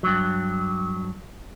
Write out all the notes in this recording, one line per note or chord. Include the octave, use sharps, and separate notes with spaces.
G2 F#3